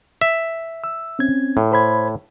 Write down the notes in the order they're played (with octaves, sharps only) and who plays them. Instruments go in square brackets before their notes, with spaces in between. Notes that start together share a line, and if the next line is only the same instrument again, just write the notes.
[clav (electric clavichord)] E5
[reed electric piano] E6
C4 C#4 G#6
[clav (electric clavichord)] A2
[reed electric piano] C5 B5 G#6